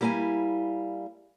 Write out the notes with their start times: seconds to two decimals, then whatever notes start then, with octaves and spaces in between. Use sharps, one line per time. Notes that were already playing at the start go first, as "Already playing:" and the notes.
0.01 G3 A#3 E4 F5 G#5